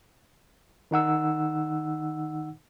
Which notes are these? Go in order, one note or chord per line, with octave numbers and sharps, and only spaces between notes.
D#3 D#4 F#5 E6